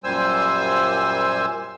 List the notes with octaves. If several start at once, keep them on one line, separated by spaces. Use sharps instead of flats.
F#2 A#2 G3 C5 G#5 E6